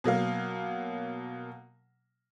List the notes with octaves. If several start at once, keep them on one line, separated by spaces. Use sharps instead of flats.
B2 F#3 A#3 F5